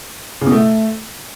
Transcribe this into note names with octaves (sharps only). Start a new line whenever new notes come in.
C#3
B2
A3